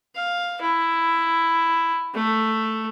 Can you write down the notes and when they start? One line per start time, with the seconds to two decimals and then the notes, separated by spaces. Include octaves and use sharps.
0.16 F5
0.61 E4
2.14 A3